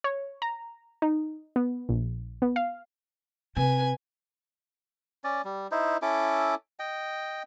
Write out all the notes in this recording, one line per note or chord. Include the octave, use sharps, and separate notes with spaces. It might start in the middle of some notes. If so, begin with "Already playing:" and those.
C#5
A#5
D#4
B3
A#1
B3
F5
C3 B4 G#5
C#4 D5
G3
D#4 E4 C5
C#4 E4 A4 D6
D#5 G5